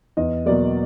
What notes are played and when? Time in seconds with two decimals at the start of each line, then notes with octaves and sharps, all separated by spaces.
0.17 E2 D#5
0.46 B2 F#3 A#3 D5